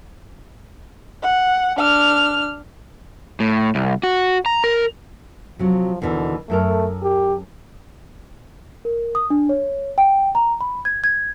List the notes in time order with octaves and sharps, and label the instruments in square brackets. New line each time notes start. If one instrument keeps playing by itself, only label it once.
[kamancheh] F#5
D4 F6
[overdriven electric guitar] A2
C2
F#4
A#5
A#4
[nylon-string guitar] C3 F#3 [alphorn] F3
[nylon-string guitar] D#2 B2 E3 [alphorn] D3
[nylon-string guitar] F#2 A4 A#4 [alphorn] A3
[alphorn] G4
[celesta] A#4
D#6
D4
C#5
G5
A#5
B5
G#6
G#6